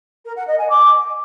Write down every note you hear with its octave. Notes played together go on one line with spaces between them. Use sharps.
A#4
F#5
D#5
G#5
D6